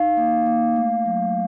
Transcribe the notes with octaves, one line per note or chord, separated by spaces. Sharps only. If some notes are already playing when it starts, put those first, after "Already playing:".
Already playing: D#4 F5
A#3
A#3
A3
F#3